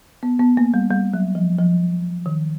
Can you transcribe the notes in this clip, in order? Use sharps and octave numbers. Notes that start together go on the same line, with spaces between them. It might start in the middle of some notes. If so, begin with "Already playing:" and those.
B3
B3
A#3
G3
G3
F#3
F3
F3
D#3